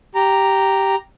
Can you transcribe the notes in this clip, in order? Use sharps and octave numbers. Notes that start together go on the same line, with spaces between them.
G4 A#5